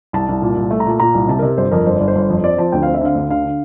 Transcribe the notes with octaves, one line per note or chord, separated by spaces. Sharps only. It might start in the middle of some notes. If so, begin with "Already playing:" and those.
C2 A5
C2
A#2
C2
A3
A#5
A#2 A5
A#2 A#5
C2
C3 A5
C3 A#4
G1 C5
F2 A#4
G1 C5
G1 D5
C5
G1
F2
C4 D5
F3 A5
D2 G5
C4 F5
E5
D3 F5
D2
D3 F5
D3